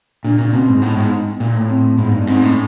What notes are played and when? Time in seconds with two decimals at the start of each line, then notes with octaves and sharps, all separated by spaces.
0.24 A#2 D4
0.38 A#2 C#4
0.53 B2 C4
0.68 G#2
0.82 A2 B3
0.92 B3
0.97 G#2
1.40 A#2
1.55 A2
1.70 C4
1.98 G#2 B3
2.12 G2
2.27 G#2 C4
2.42 A2 C#4